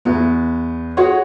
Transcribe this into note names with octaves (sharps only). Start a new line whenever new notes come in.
E2 B3
F#4 G#4 C#5 F#5